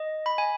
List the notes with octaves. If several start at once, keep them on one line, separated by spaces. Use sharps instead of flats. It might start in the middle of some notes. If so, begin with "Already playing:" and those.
Already playing: D#5
B5
G#5